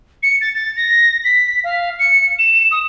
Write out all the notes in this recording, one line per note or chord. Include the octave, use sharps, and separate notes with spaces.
C#7
A6
A6
A#6
B6
F5
C#7
E7
D#6